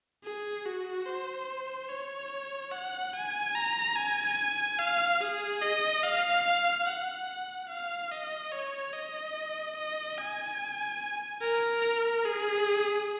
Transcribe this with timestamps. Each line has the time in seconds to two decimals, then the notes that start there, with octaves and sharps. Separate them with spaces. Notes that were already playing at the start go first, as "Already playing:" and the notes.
0.24 G#4
0.66 F#4
1.06 C5
1.89 C#5
2.72 F#5
3.13 G#5
3.55 A#5
3.96 G#5
4.79 F5
5.21 G#4
5.62 D#5
6.03 F5
6.86 F#5
7.69 F5
8.11 D#5
8.52 C#5
8.93 D#5
9.76 D#5
10.18 G#5
11.42 A#4
12.25 G#4